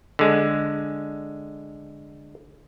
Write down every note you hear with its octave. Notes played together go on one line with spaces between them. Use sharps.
D3 G#3